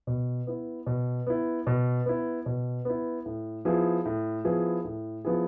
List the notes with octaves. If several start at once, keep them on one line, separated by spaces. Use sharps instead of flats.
B2
B3 E4
B2
B3 E4
B2
B3 E4
B2
B3 E4
A2
F3 B3 E4 G#4
A2
F3 B3 E4 G#4
A2
F3 B3 E4 G#4